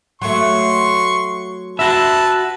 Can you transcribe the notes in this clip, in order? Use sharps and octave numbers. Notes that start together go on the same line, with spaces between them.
F#3 A3 C6 C#6
F#4 B4 E5 A5 E6